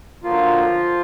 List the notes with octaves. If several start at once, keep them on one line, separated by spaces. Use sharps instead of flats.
D3 F3 F#3 A#3 F4